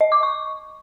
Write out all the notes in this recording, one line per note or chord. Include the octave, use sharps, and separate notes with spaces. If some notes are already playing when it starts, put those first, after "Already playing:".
D#5
D6
C#6